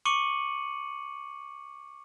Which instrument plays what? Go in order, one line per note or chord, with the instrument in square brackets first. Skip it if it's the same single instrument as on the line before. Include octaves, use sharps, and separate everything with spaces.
[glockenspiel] C#6 D6 C#7 D#7 F#7